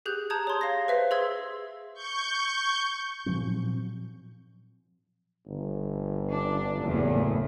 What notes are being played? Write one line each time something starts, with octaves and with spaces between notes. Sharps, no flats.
G4 G#4 F#6 G6
A5 A#5 D#6 G6 G#6
C#5 C6
F5 A#6
B4 C5 E5 F5 B6
G#4 E5 C6 E6 G#6
C#6 G6
A#2 F3 F#3 C4
G1
D4
F#1 E2 A2